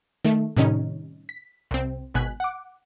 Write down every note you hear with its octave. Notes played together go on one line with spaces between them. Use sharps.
D#3 A3
A2 C3 D#3 G3 C#4 D#4
B6
C2 C4
G#1 B2 G#5 F#6 B6
F#5 D6